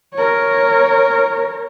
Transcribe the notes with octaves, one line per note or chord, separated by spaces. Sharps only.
A#4 C#5